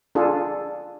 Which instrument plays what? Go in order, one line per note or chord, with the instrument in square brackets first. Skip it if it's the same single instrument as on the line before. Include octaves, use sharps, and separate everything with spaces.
[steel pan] D4 F4 G#4 A4